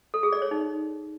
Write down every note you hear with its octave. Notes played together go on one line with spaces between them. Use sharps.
A4
G#4
D5
C#5
D#4